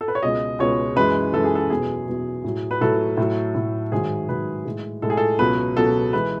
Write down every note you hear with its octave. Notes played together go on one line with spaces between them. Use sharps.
A4
B4
C#5
C#2 B2 G#3 D#5
C#2 B2 G#3 C#5
F#2 E3 G#3 B4
F#2 E3 G#3 A4
G#4
A4
E2 B2 F#3 G#4
E2 B2 F#3
A2 F#3
B4
A2 F#3 A4
A2 F#3
A2 F#3
G#2 D#3 F#3 G#4
G#2 D#3 F#3 B4
A2 G#3
A2 G#3 A4
G#4
A4
C#2 B2 F#3 B4
C#2 B2 F#3 A4
E3 G#3 B4